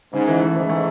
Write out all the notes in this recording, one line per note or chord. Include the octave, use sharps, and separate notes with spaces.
G#2 C#3
E3
A3
G#2 E3
A3